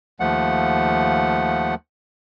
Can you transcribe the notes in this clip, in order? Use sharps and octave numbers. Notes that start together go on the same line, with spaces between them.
D#2 F3 A3 F#5